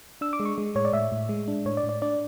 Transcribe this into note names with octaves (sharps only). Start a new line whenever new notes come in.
D4 E6
D6
G#3
C#6
G#3
A2 C#5
D5
A2 E5
A2
G#3
D4
A2 C#5
D5
A2
D5
D4 D5